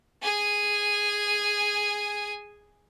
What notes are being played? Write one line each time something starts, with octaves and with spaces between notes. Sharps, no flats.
G#4 G#5